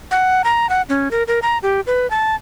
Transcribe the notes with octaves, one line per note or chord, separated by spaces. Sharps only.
F#5
A#5
F#5
C#4
A#4
A#4
A#5
G4
B4
A5